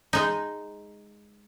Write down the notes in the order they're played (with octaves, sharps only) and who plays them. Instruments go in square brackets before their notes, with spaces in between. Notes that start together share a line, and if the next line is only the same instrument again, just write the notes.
[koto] G#3 D#4